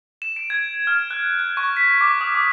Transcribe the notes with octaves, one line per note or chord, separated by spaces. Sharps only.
E7
D7
G#6
F6
F#6
F#6
C#6
B6
D6
D#6
D6